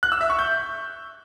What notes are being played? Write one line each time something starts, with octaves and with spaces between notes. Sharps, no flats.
F#6
E6
E5
C#6
G6